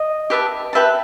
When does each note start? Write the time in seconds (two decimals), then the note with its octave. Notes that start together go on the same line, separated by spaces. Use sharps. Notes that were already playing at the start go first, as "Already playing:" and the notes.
Already playing: D#5
0.30 G4 B4 E5 A5
0.73 G4 B4 E5 A5